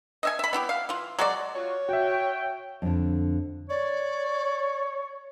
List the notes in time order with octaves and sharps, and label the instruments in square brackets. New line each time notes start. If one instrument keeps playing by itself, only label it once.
[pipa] D#5 E5 G#5
E5 B5
B3 E4 G4
F5
E3 F4
F#3 G#3 F#4 D5
[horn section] F4 F#4 [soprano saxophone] C#5
[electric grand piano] F#4 E5 [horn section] G5
[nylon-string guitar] F2 D3
[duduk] C#5 [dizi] D5